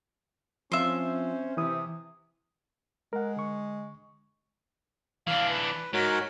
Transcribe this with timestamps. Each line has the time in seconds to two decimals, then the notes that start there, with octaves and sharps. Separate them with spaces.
0.72 F3 C4 C#4 F4 C5 E5 C6
1.57 C3 E3 E4 D#6
3.13 G#3 A#4 F#5
3.36 D3 C#6
5.27 E3 D4 F5
5.50 B4
5.93 G#2 F#4 A#4 C#5